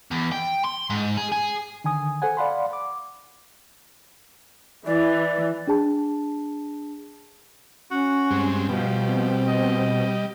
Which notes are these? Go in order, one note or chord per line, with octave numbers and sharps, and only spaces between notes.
E2
G5
C6
G#2
G#4
G#4
D3 D#3 G#5 D#6
A4 C5 F#5 G#5
D5 F5 F#5 B5 C6
D6
E3 D5
D4 G#4 A5
C#4 F#4
G2 G#3 C4
B2 F3 G3
C4
D#5